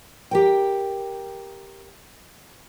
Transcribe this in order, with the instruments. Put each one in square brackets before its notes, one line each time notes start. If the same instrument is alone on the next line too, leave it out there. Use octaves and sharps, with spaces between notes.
[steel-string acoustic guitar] G4 A#4 G5